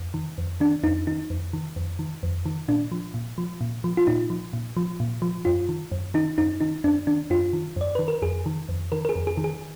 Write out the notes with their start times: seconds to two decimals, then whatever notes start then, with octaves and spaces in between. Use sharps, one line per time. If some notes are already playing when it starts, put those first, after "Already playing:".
Already playing: F2
0.14 D#3
0.38 F2
0.60 D#3 D4
0.83 F2 D#4
1.07 D#3 D#4
1.30 F2
1.53 D#3
1.76 F2
1.99 D#3
2.23 F2
2.46 D#3
2.68 A#2 D4
2.92 F3
3.14 A#2
3.38 F3
3.61 A#2
3.84 F3
3.97 F4
4.07 A#2 D#4
4.30 F3
4.53 A#2
4.77 F3
5.00 A#2
5.22 F3
5.45 F#2 F4
5.69 D#3
5.92 F#2
6.14 D#3 D#4
6.38 F#2 D#4
6.60 D#3 D#4
6.84 F#2 D4
7.07 D#3 D4
7.30 F#2 F4
7.53 D#3
7.76 F#2 D5
7.95 D#3 B4
8.08 A#4
8.22 F2 G#4
8.46 D#3
8.69 F2
8.92 D#3 A#4
9.05 A#4
9.09 G#4
9.15 F2
9.27 G#4
9.37 D#3
9.44 G#4